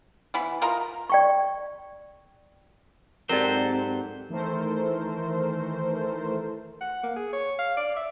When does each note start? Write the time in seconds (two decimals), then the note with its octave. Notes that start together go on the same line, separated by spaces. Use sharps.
0.34 E3 B3 B5
0.62 F4 A#4 D#5 A#5
1.10 D5 G5 C#6
3.29 G#2 F#3 C4 G4 A4 A#4 C5 D5
4.29 D#3 E3 A3 A4 A#4 C5
6.81 F#5
7.03 A#3
7.16 G#4
7.33 C#5
7.59 F5
7.77 D5
7.96 E5